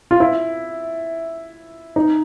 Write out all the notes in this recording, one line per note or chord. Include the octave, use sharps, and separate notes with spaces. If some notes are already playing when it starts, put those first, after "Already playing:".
F4
E4
D#4